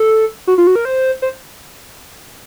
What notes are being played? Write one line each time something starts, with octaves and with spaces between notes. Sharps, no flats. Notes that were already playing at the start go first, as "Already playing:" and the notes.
Already playing: A4
F#4
F4
F#4
A#4
C5
C5